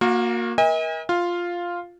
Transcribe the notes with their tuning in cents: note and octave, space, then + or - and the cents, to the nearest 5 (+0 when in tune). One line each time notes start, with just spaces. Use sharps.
A#3 +0 F#4 -35 A#4 +0
A#4 +35 D#5 +45 G#5 -40
F4 +0 F5 +0